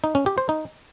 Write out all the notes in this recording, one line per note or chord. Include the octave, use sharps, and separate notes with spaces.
D#4
C#4
G4
C5
D#4